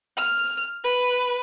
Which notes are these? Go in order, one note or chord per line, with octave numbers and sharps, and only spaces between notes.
F6
B4